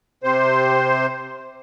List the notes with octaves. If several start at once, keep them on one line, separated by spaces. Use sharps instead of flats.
C3 C5